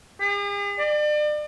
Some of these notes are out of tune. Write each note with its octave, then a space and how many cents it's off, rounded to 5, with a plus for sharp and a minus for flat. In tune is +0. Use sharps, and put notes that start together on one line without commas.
G#4 -45
D5 +35